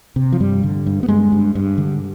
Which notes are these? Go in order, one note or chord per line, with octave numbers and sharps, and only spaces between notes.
C3
F3
G2 G3
D3
G2
B3
G2 G#3
G2
G2
D3